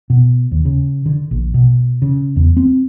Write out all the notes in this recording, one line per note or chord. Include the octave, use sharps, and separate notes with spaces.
B2
D#2
C#3
D3
A#1
B2
C#3
E2
C4